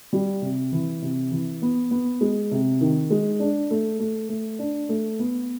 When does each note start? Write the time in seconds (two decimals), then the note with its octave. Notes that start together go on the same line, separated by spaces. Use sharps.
0.13 G3
0.42 C3
0.72 E3
1.02 C3
1.31 E3
1.62 B3
1.91 B3
2.21 G#3
2.51 C3
2.81 D#3
3.10 G#3
3.40 D4
3.71 A3
3.99 A3
4.29 A3
4.59 D4
4.89 A3
5.19 B3